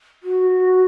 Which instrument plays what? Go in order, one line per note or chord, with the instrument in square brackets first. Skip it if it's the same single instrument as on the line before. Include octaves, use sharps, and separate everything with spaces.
[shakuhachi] F#4